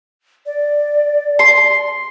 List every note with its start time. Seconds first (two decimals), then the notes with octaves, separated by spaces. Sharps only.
0.46 D5
1.39 C6